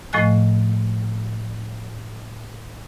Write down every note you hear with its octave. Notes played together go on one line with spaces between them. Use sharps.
A2 F3 A3 D#5 G#5 F#6